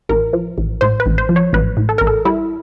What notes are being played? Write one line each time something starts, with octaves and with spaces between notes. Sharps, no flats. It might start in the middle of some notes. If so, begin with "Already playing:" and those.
A1 A#4
F3
A1
A2 C5
B4
A1
C5
F3
C#5
A1 B4
A2
A4
A1 A#4
A4
G3 E4